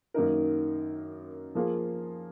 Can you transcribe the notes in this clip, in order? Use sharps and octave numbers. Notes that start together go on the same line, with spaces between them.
F#2 D#3 A#3 D#4 A#4
F3 A#3 F4 G#4